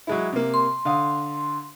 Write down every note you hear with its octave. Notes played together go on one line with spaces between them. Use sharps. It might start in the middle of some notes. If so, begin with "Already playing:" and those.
F#3 G#3 E4
C3 A#3
C6
D3 F5 D#6